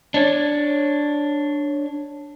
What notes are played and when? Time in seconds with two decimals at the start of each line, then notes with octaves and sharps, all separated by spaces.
0.14 D4 C#5 D5